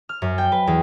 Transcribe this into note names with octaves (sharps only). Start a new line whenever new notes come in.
F6
F#2
G5
B4
E2